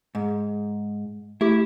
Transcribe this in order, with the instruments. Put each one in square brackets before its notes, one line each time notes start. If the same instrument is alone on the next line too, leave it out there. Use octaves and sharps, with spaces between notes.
[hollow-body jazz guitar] G#2
[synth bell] A3 G4 [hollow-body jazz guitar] E4